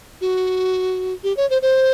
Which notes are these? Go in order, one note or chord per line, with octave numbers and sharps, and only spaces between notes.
F#4
G4
C#5
C5
C5